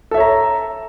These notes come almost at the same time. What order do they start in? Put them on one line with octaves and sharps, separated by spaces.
A4 E5 C#5 A#5